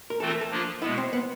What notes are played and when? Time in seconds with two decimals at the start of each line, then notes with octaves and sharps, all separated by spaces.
0.10 A#4
0.20 E3 A3 C4 F4 A4
0.30 A#4
0.41 A4
0.51 F3 A#3 D4 F4
0.82 B2 G#3 B3 E4
0.98 C4
1.13 B3